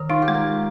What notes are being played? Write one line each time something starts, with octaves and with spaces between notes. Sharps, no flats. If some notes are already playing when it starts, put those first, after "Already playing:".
Already playing: D#3 A#4 D5
D#4 F4
G4
G#3
A#4